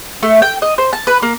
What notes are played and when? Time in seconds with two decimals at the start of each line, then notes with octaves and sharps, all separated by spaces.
0.23 A3
0.42 G5
0.62 D#5
0.78 C5
0.93 A5
1.07 B4
1.22 A#3